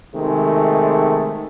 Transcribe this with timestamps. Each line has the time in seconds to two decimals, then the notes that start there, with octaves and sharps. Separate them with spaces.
0.15 C3 D#3 G#3 A3